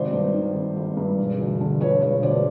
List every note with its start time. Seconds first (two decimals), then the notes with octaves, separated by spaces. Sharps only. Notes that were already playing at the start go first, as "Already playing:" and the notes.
Already playing: G#1 C3 C5 D5
0.13 G2
0.34 D#3
0.55 G#1
0.76 G#1
0.97 G2
1.18 E1
1.40 D2
1.61 D3
1.80 F3 B4 C#5
2.01 E1 B4 C#5
2.23 D2 C5 D5